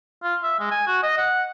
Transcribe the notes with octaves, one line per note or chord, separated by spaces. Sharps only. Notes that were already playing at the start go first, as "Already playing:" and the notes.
F4
E5
G#3
G#5
F#4
D#5
F#5